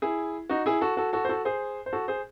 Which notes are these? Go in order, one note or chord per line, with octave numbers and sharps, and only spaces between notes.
E4 G#4
D#4 F#4
E4 G#4
F#4 A4
F#4 A4
F#4 A4
C5
F#4 A4
G#4 C5
C5
F#4 A4
G#4 C5